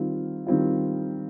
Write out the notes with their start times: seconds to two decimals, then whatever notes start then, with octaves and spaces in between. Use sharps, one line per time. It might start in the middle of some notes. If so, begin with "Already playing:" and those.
Already playing: D#3 G3 C4 F4
0.47 D#3 G3 C4 F4